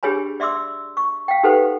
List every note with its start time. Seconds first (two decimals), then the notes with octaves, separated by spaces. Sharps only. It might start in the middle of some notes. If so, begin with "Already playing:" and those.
0.03 D4 G4 G#4 C#5 G#5 B5
0.40 D5 E5 C6 D6 E6
0.97 C#6
1.28 F5 G5
1.43 D#4 G4 A4 B4 C5 F#5